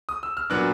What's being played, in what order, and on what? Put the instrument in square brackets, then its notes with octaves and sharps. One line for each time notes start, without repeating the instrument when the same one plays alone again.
[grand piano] D#6
E6
F6
A#2 F#3 B3 D4 F#6